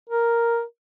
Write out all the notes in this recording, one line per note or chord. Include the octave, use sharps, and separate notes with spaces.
A#4